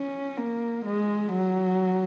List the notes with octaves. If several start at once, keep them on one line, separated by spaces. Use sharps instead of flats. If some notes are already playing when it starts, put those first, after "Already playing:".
Already playing: C#4
A#3
G#3
F#3